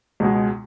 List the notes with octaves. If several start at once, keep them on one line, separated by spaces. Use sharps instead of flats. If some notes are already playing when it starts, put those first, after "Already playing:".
C#2 B2 G#3